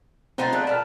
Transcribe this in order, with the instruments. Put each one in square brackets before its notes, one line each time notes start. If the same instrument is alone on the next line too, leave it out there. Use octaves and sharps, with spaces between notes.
[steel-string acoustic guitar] A2 D3 F3 [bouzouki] B3 D#4 F4 [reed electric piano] C4 A6
[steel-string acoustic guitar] D4 A4 D5 [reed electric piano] G#4 F#6
[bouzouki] A#2 A5 [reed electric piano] B5 F6